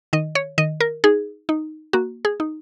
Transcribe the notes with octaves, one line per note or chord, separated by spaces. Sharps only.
D#3 D#5
C#5
D#3 D#5
A#4
D#4 G#4
D#4
A#3 F#4
G#4
D#4